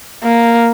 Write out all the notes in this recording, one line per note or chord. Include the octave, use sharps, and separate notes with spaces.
A#3